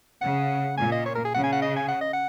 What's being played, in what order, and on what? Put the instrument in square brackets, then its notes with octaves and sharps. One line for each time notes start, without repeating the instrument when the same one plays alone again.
[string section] C#3 [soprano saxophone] F#5
[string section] A#2 [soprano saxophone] G#5
[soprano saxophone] D#5
C#5
A#4
G#4
[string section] C#3 [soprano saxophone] F#5
[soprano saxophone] G#5
F#5
D#5
G#5
F#5
D#5
F#5